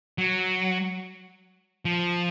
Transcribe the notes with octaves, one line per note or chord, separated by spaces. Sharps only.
F#3
F3